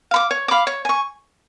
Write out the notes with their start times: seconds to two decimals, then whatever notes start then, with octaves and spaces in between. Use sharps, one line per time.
0.11 F5 B5 D6
0.31 C#5
0.48 F5 B5 D6
0.67 C#5
0.85 G#5 C#6